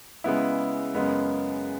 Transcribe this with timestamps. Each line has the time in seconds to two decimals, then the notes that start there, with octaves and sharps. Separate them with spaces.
0.24 C#3 G#3 B3 E4
0.95 F#2 C#3 G#3 B3